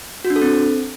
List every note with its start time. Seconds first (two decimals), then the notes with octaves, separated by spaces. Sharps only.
0.25 F#4
0.30 D4
0.36 A4
0.42 C4